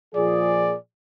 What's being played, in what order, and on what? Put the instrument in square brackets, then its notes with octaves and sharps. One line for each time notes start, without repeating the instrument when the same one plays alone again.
[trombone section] A#2 F3 G#4 [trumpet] D5